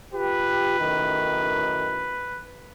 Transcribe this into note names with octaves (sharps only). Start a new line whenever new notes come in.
F4 G4 B4
F#2 A2 D#3